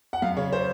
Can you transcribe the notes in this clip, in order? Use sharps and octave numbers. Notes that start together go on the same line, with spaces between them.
F#5
F#2 F5
C#3 C#5
C5